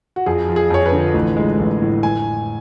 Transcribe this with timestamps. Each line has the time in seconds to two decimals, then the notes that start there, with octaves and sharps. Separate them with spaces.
0.16 F#4
0.26 F2 G#4
0.48 F3
0.56 G#4
0.70 F2 C#5
0.86 B4
0.92 D3
1.14 A1
1.37 G#3
1.59 A1
1.82 A2
2.03 G#5